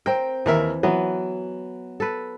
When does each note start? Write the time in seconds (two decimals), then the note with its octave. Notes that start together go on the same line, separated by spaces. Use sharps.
0.06 C4 A#4 G5
0.46 D#2 E3 A#4 E5
0.83 E3 F#3 B3
2.00 A4 B4